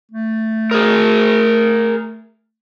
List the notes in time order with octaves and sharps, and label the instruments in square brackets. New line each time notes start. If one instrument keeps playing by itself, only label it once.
[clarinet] A3
[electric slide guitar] G#4 A#4